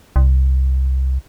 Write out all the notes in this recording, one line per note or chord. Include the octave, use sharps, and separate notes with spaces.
C2